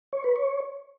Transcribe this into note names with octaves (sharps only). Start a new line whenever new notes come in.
C#5
B4
C#5